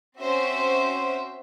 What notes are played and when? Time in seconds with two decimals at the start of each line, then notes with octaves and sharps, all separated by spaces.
0.17 C4 C#4 F#4 C5 E5